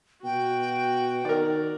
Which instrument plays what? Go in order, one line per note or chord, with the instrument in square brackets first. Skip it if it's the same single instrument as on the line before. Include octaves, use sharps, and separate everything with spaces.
[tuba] B2 [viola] F#4 [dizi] G5
[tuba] D#3 [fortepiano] A#4 D5